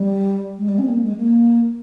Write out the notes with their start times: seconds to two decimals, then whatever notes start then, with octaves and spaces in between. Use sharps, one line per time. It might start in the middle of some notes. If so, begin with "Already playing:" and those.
Already playing: G3
0.58 G#3
0.69 G3
0.78 C#4
0.83 C4
0.88 A#3
1.03 G#3
1.17 A#3